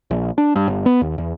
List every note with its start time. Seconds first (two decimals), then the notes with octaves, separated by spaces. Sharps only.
0.11 A#1
0.38 D4
0.56 G2
0.68 G1
0.86 B3
1.01 D#2
1.18 E2